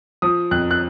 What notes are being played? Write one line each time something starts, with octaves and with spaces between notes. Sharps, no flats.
F3 D#6
F2 F#6
F#6